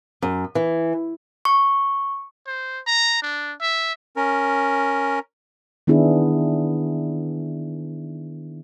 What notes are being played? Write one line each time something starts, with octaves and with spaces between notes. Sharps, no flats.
F#2
E3
C#6
C5
A#5
D4
E5
C#4 A#4
D#3 B3 D4 E4 G#4